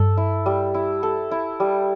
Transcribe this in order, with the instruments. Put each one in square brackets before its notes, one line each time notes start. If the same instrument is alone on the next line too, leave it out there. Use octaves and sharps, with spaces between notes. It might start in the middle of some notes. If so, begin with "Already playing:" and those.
Already playing: [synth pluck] G2 [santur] A4
[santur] E4
G3
E4
A4
E4
G3